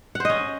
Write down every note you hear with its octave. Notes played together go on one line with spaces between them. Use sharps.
C#4 C5 D#5 F#5